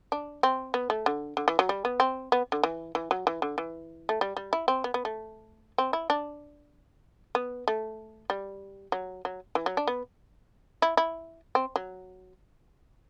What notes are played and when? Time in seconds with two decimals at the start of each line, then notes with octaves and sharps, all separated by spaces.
0.12 D4
0.43 C4
0.74 B3
0.90 A3
1.06 D3
1.37 D3
1.48 E3
1.59 F#3
1.69 G3
1.85 B3
2.00 C4
2.32 B3
2.52 D3
2.63 E3
2.95 E3
3.11 F#3
3.27 E3
3.42 D3
3.58 E3
4.09 A3
4.21 G3
4.37 G3
4.53 E4
4.68 C4
4.84 B3
4.94 B3
5.05 A3
5.78 C4
5.93 E4
6.10 D4
7.35 B3
7.68 A3
8.30 G3
8.92 F#3
9.25 F#3
9.55 E3
9.66 F#3
9.77 D4
9.87 B3
10.82 E4
10.97 E4
11.55 C4
11.76 F#3